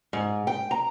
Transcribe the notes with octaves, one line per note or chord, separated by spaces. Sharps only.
G#2
G5
A#5